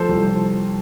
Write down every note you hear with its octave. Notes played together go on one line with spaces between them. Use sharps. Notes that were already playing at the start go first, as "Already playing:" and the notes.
Already playing: F3 A4 C5
C2
F3